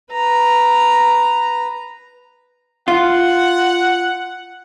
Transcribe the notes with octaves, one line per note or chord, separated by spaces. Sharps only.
B4 A#5
F4 F#5